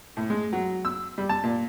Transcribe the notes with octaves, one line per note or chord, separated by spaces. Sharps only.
A2
G#3
F#3
E6
G3
A5
A#2